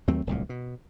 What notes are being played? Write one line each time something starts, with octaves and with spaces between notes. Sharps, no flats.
D#2 F#3 A3 C4
D1 C2 A#2
B2